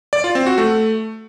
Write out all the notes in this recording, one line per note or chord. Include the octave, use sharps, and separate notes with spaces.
D5
F4
C4
F#4
A3